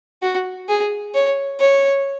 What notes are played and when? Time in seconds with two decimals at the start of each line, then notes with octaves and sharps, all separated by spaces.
0.22 F#4
0.68 G#4
1.14 C#5
1.60 C#5